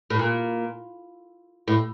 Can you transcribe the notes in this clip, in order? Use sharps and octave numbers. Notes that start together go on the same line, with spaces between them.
A2
A#2
A2